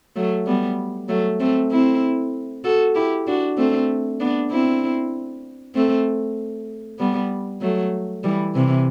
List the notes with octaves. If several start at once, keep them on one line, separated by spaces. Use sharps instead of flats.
F#3 A3
G3 B3
F#3 A3
A3 C4
C4 E4
F#4 A4
E4 G4
D4 F#4
A3 C4
B3 D4
C4 E4
A3 C4
G3 B3
F#3 A3
E3 G3
C3 E3